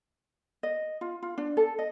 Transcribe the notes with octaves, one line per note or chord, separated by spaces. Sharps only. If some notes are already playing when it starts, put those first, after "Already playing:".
D#5
F4
F4
D4
A4
D#5